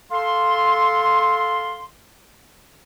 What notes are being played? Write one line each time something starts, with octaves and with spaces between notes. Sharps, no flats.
A4 F5 C6